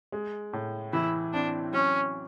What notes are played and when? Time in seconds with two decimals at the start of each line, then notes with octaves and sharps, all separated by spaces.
0.12 G#3
0.53 A2
0.93 E3 E4
1.33 C4 D4
1.73 F#3 C#4